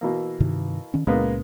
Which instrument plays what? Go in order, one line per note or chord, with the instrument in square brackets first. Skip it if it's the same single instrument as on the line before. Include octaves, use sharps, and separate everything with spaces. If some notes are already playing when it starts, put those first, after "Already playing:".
[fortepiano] B2 E3 A#3
[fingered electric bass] G2 C3 D#3
D#3 C#4
[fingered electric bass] C#2 A#2 C#4 [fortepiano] G#3 A#3 B3